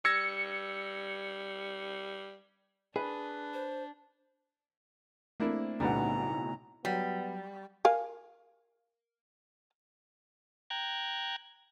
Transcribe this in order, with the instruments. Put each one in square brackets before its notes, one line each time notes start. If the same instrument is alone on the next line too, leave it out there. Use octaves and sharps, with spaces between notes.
[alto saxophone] G3 [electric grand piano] E6 G#6 A#6 [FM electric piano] C#7
[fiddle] D4 [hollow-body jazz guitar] G#4 [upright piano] B4
[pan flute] C5
[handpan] A3 C4 [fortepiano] A#3 D4 E4
[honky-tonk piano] B1 A2 F#5 [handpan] C#3 [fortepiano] G3 B3 D4 [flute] A#5
[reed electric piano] F#3 [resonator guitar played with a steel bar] G3 [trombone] B3
[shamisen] A#4 F5 G#5
[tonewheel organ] G5 A#5 F#6 G#6